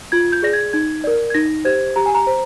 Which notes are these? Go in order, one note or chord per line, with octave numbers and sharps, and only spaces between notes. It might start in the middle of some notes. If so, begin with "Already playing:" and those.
F4 G#6
G6
G#4 D5 A#6
G#6
D#4 G#6
A#4 D5
G#6
D#4 A#6
G4 C5 G#6
G4 A#5
G#5
A#5
C5